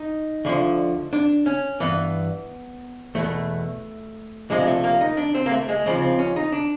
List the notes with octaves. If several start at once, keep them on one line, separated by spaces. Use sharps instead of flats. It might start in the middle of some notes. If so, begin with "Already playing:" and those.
Already playing: D#4
D2 D3 F3
D4
C#4
G2 E3 B3
E2 B2 A3
D2 C3 F3 G#3
A3
A#3
D#4
D4
C4
A#3
A3
G#3
D#2 C#3 F3 C4
C4
C#4
D#4
D4